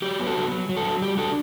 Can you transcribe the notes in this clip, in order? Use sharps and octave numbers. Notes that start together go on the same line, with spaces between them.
F#3 G4
B3
F#4 A4
F#3
F#3
F#3
F#4 A4
F#3
G3 G4
D4 F#4 A4